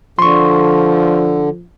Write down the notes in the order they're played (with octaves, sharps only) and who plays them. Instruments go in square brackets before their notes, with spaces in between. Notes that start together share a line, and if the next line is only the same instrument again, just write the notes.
[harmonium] D3 [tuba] F3 [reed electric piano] C6 C#6